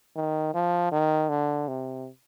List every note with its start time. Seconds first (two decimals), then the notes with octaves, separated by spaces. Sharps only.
0.16 D#3
0.54 F3
0.92 D#3
1.29 D3
1.68 C3